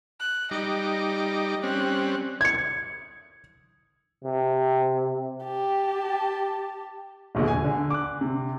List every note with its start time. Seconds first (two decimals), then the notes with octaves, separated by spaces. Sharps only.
0.20 F#6
0.51 G3 D#4 D#5 D6
1.63 G3 C4 C#4 F#6
2.41 G#6 C#7
4.24 C3
5.44 G4 A5
7.35 D#1 A#1 B2 D3
7.48 G#5
7.64 D3
7.90 D6 F#6
8.21 C3